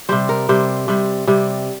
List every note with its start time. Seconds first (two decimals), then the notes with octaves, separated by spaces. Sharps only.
0.09 C3 G3 C5
0.29 A#4
0.49 C3 G3 C5
0.88 C3 G3
1.27 C3 G3